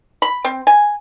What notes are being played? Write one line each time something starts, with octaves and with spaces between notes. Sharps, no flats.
B5
C4
G#5